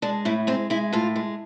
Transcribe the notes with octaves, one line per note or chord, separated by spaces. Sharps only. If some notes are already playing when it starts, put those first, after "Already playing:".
G#3 D4
A2 E4
G#3 C4
G#3 E4
A2 F4
G#3